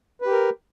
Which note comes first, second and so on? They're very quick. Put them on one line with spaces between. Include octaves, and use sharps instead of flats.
B4 G4 A#4